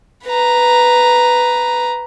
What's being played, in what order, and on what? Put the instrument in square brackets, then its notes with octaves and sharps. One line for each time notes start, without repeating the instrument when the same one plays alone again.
[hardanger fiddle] B4 A#5